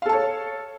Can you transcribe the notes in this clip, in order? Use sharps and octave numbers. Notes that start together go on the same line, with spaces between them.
A4 C#5 F5 A5